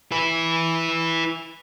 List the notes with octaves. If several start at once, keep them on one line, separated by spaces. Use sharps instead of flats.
E4 B4